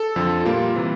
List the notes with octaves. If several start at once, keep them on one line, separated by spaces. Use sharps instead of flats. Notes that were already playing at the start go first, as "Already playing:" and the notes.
Already playing: A4
F2 D3 F3
A#2 G3 A#3 F4
C3 E3 G3